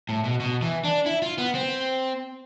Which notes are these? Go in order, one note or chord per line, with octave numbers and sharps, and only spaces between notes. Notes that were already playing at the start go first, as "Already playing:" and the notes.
A2
B2
B2
E3
D4
E4
F4
B3
C4